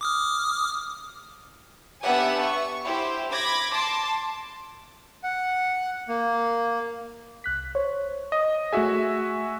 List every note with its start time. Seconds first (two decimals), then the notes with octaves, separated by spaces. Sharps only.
0.01 D6 D#6 F6
2.03 B3 D4 G4 E5 F#5 G#5
2.42 C#6
2.84 E4 G4 C5
3.32 B5 D6 G#6 A#6
3.74 A5 C6 D6
5.23 F#5
6.09 A#3
7.44 C2 F#6 B6
7.75 C5 C#5
8.32 D#5
8.72 A3 F#4 G#4 E5 G#5